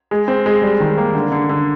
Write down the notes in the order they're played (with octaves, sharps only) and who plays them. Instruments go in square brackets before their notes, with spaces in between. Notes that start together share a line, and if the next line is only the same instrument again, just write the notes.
[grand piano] G#3
C4
G#3
G3
D#3
A#3
D3
D3
D3